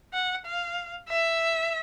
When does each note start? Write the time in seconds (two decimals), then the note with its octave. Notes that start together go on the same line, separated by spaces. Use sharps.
0.13 F#5
0.45 F5
1.08 E5